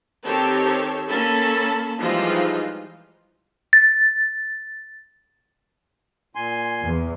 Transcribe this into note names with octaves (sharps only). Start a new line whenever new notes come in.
D#3 C4 G4 A4 C#5 A5
A#3 C#4 A4 A5 B5
E3 F3 G3 G#3 D#4 F4
A6
A#2 G#5 C6
E2